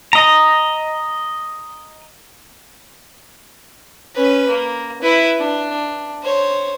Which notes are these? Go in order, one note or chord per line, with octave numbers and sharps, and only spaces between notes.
D#5 A#5
C#4 B4
A#3
E4 B4
D4
C5 C#5